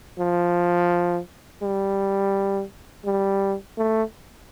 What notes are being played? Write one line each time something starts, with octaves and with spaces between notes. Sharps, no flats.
F3
G3
G3
A3